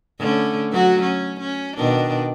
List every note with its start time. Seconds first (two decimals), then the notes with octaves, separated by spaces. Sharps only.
0.19 D3 A3 C#4
0.72 F#3 F#4
1.01 C#4
1.40 C#4
1.76 B2 D#3 D4